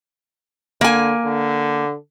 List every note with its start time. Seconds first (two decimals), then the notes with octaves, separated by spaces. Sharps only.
0.81 D3 A#3 G#5
1.26 D3